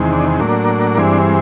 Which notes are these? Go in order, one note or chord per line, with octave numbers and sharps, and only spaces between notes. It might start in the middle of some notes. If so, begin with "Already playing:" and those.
Already playing: E2 C3 D#3 G#3
D4
A2 F#3 A#3 D4
G2 E3 G#3 C4